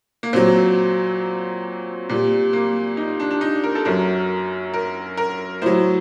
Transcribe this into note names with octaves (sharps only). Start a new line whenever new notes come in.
A#3
A#2 F#3 C4
A#2 G3
A#3
D#4
D4
D4
D#4
A#4
A4
F#2 F#3 A#4
A#4
A#4
A2 F#3 C5